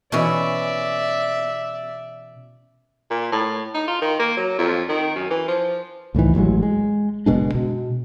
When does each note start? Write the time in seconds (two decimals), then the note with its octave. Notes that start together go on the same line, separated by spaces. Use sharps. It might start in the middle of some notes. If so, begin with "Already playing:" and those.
0.12 B2 E3 C#4 D5 E5
3.11 A#2
3.32 A2
3.74 D#4
3.88 F4
4.02 D#3
4.20 A#3
4.37 F#3
4.59 F2
4.89 D#3
5.16 F#2
5.30 E3
5.48 F3
6.14 C#2 A2 D#3 E3
6.35 A1 A2 F#3 G#3
6.63 G#3
7.26 F#1 B2 G#3 D4
7.55 B2